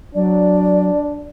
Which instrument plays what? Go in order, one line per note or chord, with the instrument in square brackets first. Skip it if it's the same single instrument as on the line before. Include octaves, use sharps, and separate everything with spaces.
[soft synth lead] F#3 [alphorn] D4 [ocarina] D5